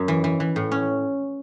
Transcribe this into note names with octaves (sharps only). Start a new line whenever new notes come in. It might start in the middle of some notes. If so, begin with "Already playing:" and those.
Already playing: F#2
E3
E3
E3
A2
C#4